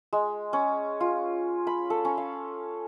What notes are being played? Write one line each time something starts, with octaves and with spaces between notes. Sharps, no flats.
G#3
C#4
F4
B5
A4
C#4
F5